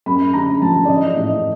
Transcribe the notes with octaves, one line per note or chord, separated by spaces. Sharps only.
F#2 B5
D3 A#5
F3 A5
D5
A1 D#5
A2 D#5